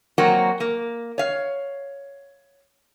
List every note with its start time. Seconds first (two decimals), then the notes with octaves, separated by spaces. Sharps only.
0.18 F#3 A#3 C4 F#4
0.60 A#3
1.18 C#5 F5